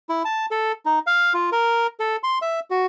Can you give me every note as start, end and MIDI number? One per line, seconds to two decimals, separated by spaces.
0.09 0.23 64
0.25 0.46 81
0.51 0.72 69
0.86 0.99 63
1.07 1.33 77
1.34 1.50 65
1.52 1.87 70
2.00 2.16 69
2.24 2.39 84
2.42 2.60 76
2.71 2.86 66